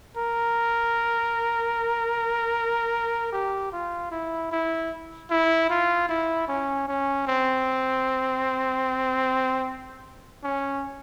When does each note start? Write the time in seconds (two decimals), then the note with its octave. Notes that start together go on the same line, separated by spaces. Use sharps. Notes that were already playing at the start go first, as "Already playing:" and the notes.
0.17 A#4
3.32 G4
3.72 F4
4.11 E4
4.51 E4
5.30 E4
5.70 F4
6.09 E4
6.48 C#4
6.88 C#4
7.27 C4
10.43 C#4